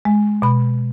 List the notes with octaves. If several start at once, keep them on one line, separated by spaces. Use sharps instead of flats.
G#3
B2 B5